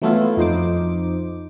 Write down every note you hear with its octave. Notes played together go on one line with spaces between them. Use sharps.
E3 F#3 A3 B3 E4 F4
F2 D#4 C5 D6